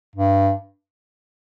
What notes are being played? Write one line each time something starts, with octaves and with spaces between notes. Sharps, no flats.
G2